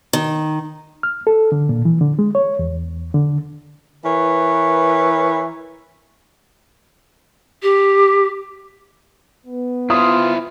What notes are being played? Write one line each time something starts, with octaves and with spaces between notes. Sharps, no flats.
D#3
F6
A4
D3
A#2
E3
D3
G#3
C#5
E2
D3
E3 A#4 B4 C#5
G4
B3
E4 F4 C5 D#6